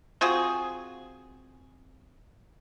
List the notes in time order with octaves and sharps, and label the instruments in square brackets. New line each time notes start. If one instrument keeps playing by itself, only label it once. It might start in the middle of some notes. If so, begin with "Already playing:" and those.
[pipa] C4 F4 F#4 G#4